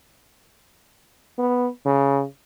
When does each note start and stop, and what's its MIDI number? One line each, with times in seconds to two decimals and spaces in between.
1.38 1.68 59
1.85 2.23 49